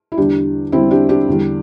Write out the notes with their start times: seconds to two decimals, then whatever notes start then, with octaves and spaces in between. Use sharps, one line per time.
0.12 E4
0.17 E2 D3 G3 D4 G4
0.72 E2 D3 G3 C4 E4
0.91 D4 G4
1.09 D4 G4
1.27 E2 D3 G3